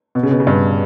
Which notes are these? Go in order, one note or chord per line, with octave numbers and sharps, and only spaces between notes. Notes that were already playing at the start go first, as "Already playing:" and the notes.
B2
C#3
B2
C#3
G2